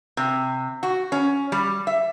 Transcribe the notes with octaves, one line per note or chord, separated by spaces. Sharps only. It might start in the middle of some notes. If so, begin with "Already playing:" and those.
C3
F#4
C#4
G3
E5